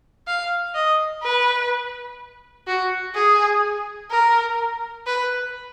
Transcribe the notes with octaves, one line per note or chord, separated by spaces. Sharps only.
F5
D#5
B4
F#4
G#4
A#4
B4